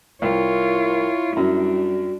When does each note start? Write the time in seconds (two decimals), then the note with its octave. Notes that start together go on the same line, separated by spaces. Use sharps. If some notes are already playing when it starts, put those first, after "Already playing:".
0.22 C2 E4 F4 A#4 C#5
1.37 F#2 G3 D4 F#4